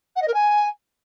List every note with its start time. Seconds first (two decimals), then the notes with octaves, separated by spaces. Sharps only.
0.16 F#5
0.22 D#5
0.28 A#4
0.33 G#5